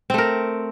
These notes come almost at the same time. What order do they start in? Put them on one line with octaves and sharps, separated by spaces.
C4 A3 A#4